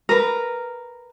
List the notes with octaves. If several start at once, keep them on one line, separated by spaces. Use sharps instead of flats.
A#4 B4